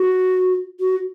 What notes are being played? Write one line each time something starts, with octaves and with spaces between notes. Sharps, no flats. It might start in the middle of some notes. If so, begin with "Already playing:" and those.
Already playing: F#4
F#4